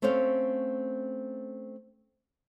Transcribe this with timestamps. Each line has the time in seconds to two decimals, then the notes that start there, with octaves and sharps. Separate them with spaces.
0.02 A3 C4 C#4 C5 C#5 F5